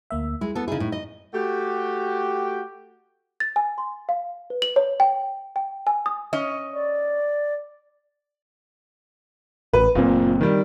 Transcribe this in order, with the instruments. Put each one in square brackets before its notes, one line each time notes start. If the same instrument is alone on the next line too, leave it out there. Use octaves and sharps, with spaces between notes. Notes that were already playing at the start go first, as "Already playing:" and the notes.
[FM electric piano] D2 A#3 E5
[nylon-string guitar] G#3 [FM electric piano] E4
[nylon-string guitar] B3 A4
[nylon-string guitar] C#3 G#4 [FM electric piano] D#4 E4
[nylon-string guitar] A2
D#5
[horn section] A3 F#4 G4
[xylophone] A6
G#5
C6
F5
B4
F#7
C#5
G5
G5
G#5
D#6
[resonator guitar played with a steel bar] C#4 D#5
[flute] D5
[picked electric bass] A1 [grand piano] B4
[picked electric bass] F#1 C4 [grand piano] A#2
[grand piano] D#3 G3